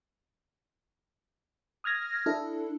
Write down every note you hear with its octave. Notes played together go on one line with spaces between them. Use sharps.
D#6 F6 G#6 A#6
D4 E4 A4